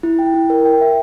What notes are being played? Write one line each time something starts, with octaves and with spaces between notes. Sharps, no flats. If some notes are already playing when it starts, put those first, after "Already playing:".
E4
G5
E4
A#4
G5
E5